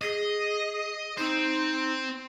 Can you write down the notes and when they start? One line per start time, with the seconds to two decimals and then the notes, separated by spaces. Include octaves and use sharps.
0.02 G#4 D#5
1.18 C4 D#4 C5